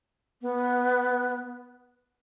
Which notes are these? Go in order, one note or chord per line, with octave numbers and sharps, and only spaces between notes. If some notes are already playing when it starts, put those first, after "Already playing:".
B3